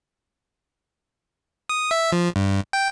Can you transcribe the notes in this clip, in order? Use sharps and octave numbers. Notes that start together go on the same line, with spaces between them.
D#6
E5
F3
G2
G5